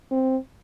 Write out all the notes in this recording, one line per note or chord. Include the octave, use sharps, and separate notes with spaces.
C4